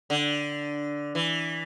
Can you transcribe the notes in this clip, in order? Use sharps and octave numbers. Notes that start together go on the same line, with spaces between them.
D3
E3